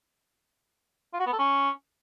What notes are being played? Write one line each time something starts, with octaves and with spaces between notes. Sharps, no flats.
F4
F#4
B3
A4
C#4